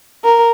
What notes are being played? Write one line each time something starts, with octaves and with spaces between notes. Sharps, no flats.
A#4